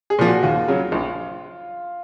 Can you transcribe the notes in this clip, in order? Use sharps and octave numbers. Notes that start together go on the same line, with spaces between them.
G#4
A#2 F3
F#4
D#2 F4
C#3 F#3
A#1